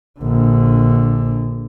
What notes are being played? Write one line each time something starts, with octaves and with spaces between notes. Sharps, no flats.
A#1 D3